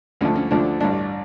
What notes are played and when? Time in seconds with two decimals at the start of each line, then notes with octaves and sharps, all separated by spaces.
0.21 D2 D3 F3 A3 C#4
0.36 C#4
0.51 D2 D3 F3 A3 D4
0.81 A1 G2 D3 A3 D4